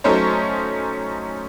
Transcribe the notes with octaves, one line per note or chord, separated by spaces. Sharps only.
F#3 A3 C#4 D#4 C5 C#5